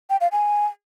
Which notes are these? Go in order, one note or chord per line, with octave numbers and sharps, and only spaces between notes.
G5
F5
G#5